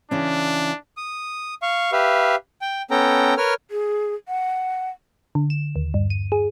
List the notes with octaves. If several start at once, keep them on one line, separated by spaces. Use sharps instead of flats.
C#3 E3 C#4 D4
D#6
F5 C#6
G4 B4 E5 F5
G5
B3 C#4 A4 G5 A#5
A#4 B4 C#5 F6
G#4
F#5
D3
E7
D#2
G2
D#7
G#4